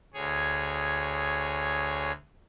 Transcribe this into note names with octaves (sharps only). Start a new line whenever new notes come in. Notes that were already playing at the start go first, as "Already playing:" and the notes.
D2 G#4 C#5